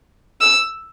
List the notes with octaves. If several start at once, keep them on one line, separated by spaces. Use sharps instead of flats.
E6